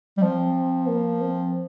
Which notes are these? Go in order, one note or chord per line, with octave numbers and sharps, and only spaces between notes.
G3
F3 C4
A#3
C4